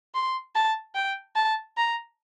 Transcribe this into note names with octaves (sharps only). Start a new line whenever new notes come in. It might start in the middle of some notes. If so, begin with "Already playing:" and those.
C6
A5
G5
A5
A#5